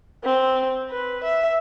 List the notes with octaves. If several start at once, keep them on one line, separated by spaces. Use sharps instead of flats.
C4
B4
E5